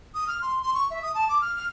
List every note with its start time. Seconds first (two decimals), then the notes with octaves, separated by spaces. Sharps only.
0.15 D#6
0.27 F6
0.42 C6
0.62 C6
0.74 C#6
0.90 E5
1.02 D#6
1.15 A5
1.29 D6
1.42 F6
1.55 F6